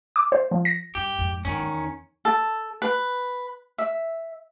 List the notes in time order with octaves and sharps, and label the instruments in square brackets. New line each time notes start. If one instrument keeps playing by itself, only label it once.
[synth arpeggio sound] D6
C5
F3
A#6
[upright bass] G2 [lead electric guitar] G4
[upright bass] F2 G#2
[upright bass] G#2 [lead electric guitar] D#3 C#4
[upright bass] E2
[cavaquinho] A4
B4
E5